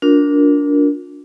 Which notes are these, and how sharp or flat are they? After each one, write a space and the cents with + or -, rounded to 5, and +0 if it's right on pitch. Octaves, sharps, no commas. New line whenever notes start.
D4 -20 F4 +35 A#4 +0